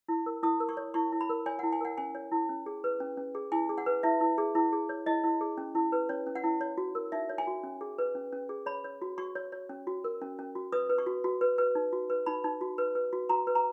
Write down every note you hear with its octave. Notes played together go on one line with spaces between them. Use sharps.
E4
A#4
E4 D#6
A#4
C#6
C#5
E4 C#6
E4
B5
A#4
C#5 G#5
F#5
E4
G#5
A#4 F#5
C#4 G#5
C#5
E4
C#4
G#4
B4
C#4
C#4
G#4
E4 G#5
G#4
F#5
B4
E4 E5
E4
G#4
E4
G#4
C#5
E4 D#5
E4
G#4
C#4
E4
B4
C#4 C#5
C#4
F#5
E4
C#5
F#4
A#4
D#4 E5
C#5
G#5
F#4
C#4
G#4
B4
C#4
C#4
G#4
C#5 B5
C#5
F#4
F#4 C#6
C#5
C#5
C#4
F#4
A#4
C#4
C#4
F#4
B4 D#6
B4
C#6
F#4
F#4
B4
B4
D#4
F#4
B4
D#4 B5
D#4
F#4
B4
B4
F#4
F#4 A#5
B4
A#5